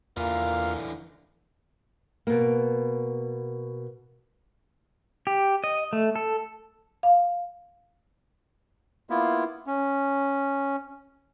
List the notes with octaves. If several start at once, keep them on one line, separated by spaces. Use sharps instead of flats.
E2 D3 E3 A#3 F4
B2 A#3
G4
D#5
A3
A4
F5
A#3 B3 E4 F4
C#4